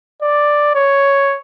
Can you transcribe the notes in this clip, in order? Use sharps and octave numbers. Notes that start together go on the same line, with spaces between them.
D5
C#5